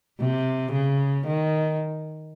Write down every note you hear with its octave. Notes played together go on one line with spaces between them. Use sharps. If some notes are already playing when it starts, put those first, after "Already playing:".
C3
C#3
D#3